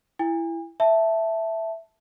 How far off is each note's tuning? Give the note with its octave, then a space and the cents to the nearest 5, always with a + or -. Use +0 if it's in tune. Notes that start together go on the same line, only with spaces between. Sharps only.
E4 +15 G#5 -40
E5 +0 A5 +0